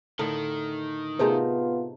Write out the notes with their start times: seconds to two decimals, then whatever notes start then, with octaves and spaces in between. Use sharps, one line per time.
0.19 A2 D3 D#3 A#4
1.19 C3 A3 B3 D#4 F4 G#4 A#4 C5